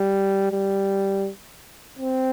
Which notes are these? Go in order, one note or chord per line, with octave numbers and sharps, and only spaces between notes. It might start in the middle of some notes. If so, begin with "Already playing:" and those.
Already playing: G3
G3
C4